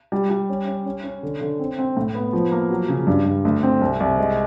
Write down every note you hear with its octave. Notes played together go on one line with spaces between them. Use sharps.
G3
G3
C#4
C#4
C#4
C#4
D3
D3
C4
C4
A2
B3
F3
A#3
F#3
C#3
G2
G2
D2
C4
C2
C2
G#3